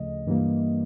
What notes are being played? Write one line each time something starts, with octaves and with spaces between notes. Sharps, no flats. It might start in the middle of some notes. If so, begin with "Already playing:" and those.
Already playing: D2 C#3 F3 A3 D#5
G2 E3 G3 A#3